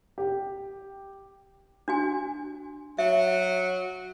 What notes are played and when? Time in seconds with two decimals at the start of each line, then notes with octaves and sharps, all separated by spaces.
0.18 G4
1.88 D4 F#4 G#5
2.99 F#3 E5